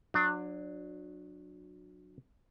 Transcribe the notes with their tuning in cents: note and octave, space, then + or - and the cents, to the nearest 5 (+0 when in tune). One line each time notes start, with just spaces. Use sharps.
F#3 -30 D4 +15